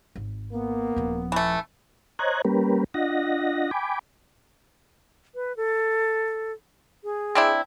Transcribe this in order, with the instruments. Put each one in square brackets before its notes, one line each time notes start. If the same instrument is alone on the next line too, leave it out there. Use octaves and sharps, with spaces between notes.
[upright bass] G#1
[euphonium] A#3 [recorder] B3
[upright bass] D#1 F3
[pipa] E3 A3
[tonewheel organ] C5 C#5 D#5 A#5 F#6 G#6
G3 A#3 C#4 G4 A#4 B4
D4 F4 D#5 F#5 A#6
G5 G#5 B5 D6
[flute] B4
A4
G#4
[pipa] C4 D4 E4